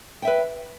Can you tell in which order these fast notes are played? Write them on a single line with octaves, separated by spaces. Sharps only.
G5 E5 B4